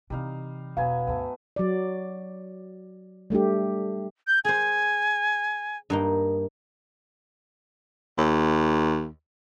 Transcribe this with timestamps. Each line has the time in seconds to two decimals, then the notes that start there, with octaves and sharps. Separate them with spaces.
0.10 C3 E3 G3 D#4 F5
0.77 E1 F#3 B3 F5 G#5
1.07 D2 G2 A3 B3
1.56 F#3 D5
3.30 G3 A3 D4 G4
4.27 G6
4.45 G#4 C5 G#5
5.90 G2 A#3 D#4
8.18 D#2